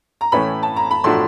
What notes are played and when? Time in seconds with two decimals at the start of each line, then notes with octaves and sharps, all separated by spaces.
0.21 A#5
0.32 A2 E3 A3 C#4 B5
0.63 A5
0.76 A#5
0.91 B5
1.04 A2 F3 A3 D4 F#4 C6